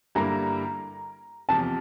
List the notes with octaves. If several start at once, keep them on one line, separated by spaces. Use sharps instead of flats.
G2 D3 G3 A#3 E4 A#5
E2 C3 F3 A5